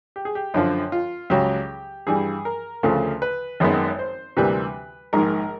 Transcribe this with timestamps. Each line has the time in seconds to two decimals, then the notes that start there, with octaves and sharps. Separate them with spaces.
0.16 G4
0.25 G#4
0.35 G4
0.54 F#2 D3 F3
0.92 F4
1.30 C#2 C#3 F#3 G4
2.07 G2 E3 G3 G#4
2.45 A#4
2.83 D2 C#3 F3 A3
3.22 B4
3.60 G#1 F#2 D#3 G#3 B3
3.99 C5
4.37 D2 C3 E3 G3 A#3 B4
5.13 A#1 G#2 D#3 A#4